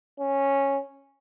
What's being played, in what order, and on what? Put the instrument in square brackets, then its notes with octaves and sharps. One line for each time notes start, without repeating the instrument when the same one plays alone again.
[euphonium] C#4